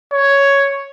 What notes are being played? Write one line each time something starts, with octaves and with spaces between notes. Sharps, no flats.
C#5